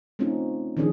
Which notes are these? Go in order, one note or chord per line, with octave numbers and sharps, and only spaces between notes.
A3 C4 C#4 D#4 F4
D#3 F3 C#4 D4 G#4